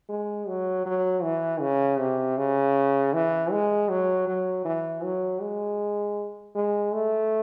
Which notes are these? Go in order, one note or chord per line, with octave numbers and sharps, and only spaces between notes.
G#3
F#3
F#3
E3
C#3
C3
C#3
E3
G#3
F#3
F#3
E3
F#3
G#3
G#3
A3